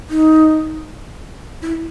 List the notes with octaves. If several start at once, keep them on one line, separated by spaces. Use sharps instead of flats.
D#4
E4